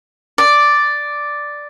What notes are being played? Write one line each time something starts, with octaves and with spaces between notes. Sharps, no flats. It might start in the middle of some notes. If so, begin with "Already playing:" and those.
D5